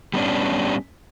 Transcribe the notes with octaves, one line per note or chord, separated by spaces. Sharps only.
G3 B3 C#4 D4